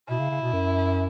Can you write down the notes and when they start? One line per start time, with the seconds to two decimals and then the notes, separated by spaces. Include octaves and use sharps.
0.08 B2 E4
0.19 C#3
0.30 C#3
0.42 B2
0.53 F#2